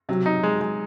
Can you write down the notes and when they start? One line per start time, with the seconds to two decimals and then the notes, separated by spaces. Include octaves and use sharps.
0.09 C3 F#3
0.26 D#4
0.43 G#3
0.61 G#3